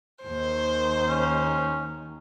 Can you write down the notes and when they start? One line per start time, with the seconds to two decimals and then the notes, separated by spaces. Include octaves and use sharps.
0.23 D#2 D#3 C5
1.09 C#4